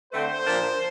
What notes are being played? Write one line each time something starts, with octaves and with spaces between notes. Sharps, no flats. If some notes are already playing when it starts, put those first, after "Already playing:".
D3 A3 C4 C5
A#2 F3 A#3 D4